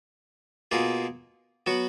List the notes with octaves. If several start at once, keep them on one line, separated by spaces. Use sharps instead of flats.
B2 A#3 F4 G#4
F#3 B3 F#4